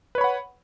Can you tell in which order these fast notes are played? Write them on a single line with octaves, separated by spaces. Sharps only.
B4 C#5 B5 F#5